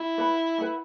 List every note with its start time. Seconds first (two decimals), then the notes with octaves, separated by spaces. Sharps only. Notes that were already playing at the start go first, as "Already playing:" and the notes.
Already playing: E4
0.18 B4 F#5 B5
0.58 B4 F#5 B5